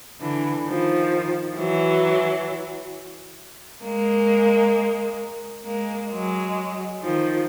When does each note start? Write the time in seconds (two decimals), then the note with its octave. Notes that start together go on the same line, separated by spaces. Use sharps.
0.21 D3 E3
0.66 D#3 F3
1.57 E3 F#3
3.84 G#3 A#3
5.66 G#3 A#3
6.12 F#3 G#3
7.02 D#3 F3